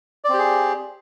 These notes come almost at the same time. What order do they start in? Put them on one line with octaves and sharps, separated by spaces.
D5 C4 G4 G#4